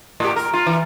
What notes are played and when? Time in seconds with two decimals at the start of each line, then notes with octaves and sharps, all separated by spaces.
0.20 A2 G4
0.36 A#4
0.53 F4
0.66 E3